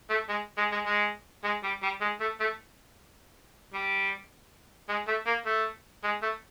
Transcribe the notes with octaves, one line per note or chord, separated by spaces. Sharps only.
A3
G#3
G#3
G#3
G#3
G#3
G3
G3
G#3
A3
A3
G3
G#3
A3
A#3
A3
G#3
A3